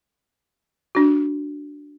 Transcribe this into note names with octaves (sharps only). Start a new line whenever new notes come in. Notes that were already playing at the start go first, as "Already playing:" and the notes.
D4 F#4